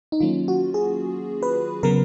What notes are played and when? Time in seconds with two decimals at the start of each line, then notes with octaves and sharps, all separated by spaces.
0.12 D#4
0.20 D#3 F#3 A#3 C#4 F4
0.48 F#4
0.74 G#4
1.43 B4
1.83 C#3 F#3 B3 A#4